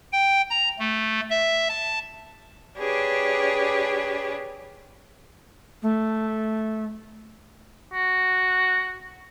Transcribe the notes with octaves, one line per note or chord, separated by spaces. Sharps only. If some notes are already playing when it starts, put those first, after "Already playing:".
G5
A#5
A3
E5
A5
D4 G4 G#4 B4 C#5
A3
F#4